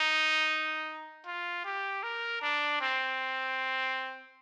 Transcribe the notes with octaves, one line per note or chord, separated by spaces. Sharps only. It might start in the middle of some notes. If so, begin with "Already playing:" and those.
Already playing: D#4
F4
G4
A#4
D4
C4